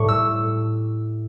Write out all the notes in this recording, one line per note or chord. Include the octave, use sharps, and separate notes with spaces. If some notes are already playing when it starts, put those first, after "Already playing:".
Already playing: A2 G3 C#6
E6